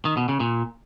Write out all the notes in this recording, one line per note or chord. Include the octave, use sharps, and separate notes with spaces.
D#3
B2
C#3
A#2